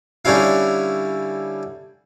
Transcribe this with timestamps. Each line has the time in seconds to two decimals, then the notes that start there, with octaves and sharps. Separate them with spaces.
0.25 D3 G3 C#4 E4 F5